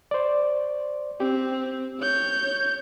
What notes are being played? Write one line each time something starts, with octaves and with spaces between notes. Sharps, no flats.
C5 D5
C4 G4
C#5 G6